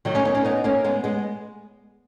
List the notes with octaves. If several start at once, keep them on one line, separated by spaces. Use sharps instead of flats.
D#3 F#3
A#3 C#4
B3 D#4
A#3 C#4
B3 D#4
A#3 C#4
G#3 B3
G#3 B3